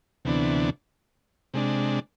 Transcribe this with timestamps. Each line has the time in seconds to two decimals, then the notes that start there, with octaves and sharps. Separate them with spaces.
0.25 D2 C3 E3 B3 D4
1.54 C3 G#3 D4